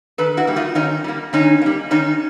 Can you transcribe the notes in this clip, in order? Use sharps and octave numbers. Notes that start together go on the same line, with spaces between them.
D#3 A4 B4
E4 F#4
G3 A#3
D#4 F4
D#3 C#4 D#4
G3 A#3
D#3 C#4 D#4
G3 A#3
D#3 C#4 D#4